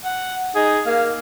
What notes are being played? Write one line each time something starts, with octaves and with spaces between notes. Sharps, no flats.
F#5
D#4 G#4
A#3 F5